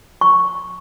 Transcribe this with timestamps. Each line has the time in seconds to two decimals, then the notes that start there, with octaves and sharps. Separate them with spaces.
0.21 C#6